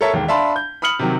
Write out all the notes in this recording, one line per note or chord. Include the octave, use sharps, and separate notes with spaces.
A4 A#4 C#5 E5 A5
E1 D#2
D4 E5 F5 A5 B5 C6
G6
B5 D#6 F6 C#7 F#7
C3 D#3 F#3